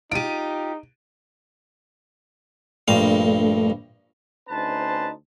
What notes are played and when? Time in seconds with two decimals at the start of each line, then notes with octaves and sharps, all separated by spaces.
0.11 D#4 F4 G4 D7 D#7
2.88 A#1 G2 A3 F5
4.49 D2 C#4 D#4 B4 C5 A5